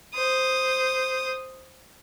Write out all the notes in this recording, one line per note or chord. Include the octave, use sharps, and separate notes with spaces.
C5 D#6